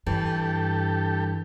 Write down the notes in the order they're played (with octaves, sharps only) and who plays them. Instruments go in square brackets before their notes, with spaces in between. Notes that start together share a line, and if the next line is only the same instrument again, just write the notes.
[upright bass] G2 [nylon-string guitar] E3 [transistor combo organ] G4 A4